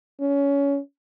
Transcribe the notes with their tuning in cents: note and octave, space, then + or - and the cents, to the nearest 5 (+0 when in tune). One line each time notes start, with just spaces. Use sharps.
C#4 +20